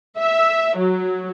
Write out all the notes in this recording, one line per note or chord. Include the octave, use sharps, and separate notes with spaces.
E5
F#3